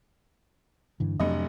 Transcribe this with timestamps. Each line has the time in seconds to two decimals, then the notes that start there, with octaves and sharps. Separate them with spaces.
1.00 G2 D3 E3
1.20 F1 F2 A2 F#3 D4 D#5